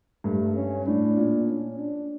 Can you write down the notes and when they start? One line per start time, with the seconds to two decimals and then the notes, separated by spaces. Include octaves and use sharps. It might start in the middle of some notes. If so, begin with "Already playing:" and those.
0.24 G2 A3
0.55 C#4
0.87 A2 D4
1.17 A#2
1.49 C#4
1.79 D4